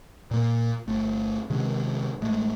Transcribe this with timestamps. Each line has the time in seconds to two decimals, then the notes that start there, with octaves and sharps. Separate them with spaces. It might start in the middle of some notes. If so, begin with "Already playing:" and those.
0.31 A#2 A#3
0.87 G1 A3
1.50 C3 D#3 G#3 C#4
2.21 A1 G#3 A3